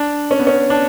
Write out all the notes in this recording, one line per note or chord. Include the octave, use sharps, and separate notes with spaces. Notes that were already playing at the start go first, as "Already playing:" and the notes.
Already playing: D4
C#4
B3
C#4
D4